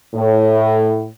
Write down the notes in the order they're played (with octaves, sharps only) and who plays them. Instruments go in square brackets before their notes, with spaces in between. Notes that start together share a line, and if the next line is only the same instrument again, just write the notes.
[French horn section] A2